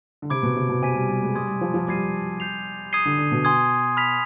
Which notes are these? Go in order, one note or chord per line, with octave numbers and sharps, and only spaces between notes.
D3
C3 B5 D6 G#6 D7
B2
C3
B2
C3 G#5 D6 G#6 B6 D#7
G3
G3
G#3
G3 C6 D#6 G#6
G3
F3
F3
G3 D6 G#6 C7 D#7
G6 C7 F7
D#6 G#6 C7 D#7 G7
D3
D3
B2
G#5 C6 D#6 G#6
B5 F6 B6 F7